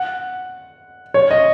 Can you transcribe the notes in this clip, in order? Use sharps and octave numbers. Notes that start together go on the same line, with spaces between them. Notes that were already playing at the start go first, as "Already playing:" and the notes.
Already playing: F#5
C#5
D#5